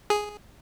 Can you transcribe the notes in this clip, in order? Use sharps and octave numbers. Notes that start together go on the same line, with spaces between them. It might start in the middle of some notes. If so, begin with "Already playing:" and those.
G#4